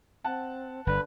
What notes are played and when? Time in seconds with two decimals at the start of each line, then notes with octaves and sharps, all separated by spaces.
0.24 C4 F#5 A5 F#6
0.87 G1 D3 B4